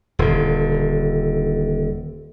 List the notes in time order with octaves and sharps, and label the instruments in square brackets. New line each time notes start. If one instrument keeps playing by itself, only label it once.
[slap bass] D#1 D3